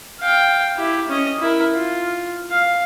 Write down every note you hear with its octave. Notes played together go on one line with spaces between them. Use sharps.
F5 G5
E4 G4
C#4 D#5
E4 A#4
F4
F5